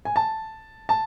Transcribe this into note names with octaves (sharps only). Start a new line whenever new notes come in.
G#5
A5
A5